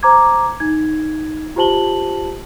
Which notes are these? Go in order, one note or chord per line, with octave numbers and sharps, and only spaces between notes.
C5 A#5 D6 G#6
D#4 G#6
F4 G4 C5 A5 F#7 G7